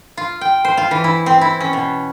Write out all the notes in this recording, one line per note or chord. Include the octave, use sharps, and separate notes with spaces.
F4
G5
C5
F4
E3
E4
C4
E4
C#4
B2